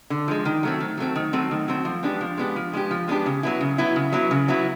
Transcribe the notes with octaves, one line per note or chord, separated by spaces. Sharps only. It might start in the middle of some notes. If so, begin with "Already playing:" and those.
D3
F3 G#3
D#3
F#3 A3 C4
D#3
F#3 A3 C4
D#3
F#3 A3 C4
D#3
F#3 A3 C4
F3
G#3 B3 D4 G4
F3
G#3 B3 D4 G4
F3
G#3 B3 D4 G4
F3
G#3 B3 D4 G4
C#3
F#3 B3 E4
C#3
F#3 B3 E4
C#3
F#3 B3 E4
C#3
F#3 B3 E4